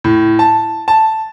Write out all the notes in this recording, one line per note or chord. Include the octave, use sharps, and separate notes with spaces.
A2
A5
A5